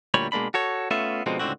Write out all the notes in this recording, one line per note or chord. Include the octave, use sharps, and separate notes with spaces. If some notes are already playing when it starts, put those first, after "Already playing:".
D2 A#2 G3 C#5 B5
B2 G#3 A#3 D4 B5
F#4 A4 C#5
A3 B3 C#4 F4 E5
B2 D3 F3 G#3 C4 D#4
C#2 A2 D3 C4 F#4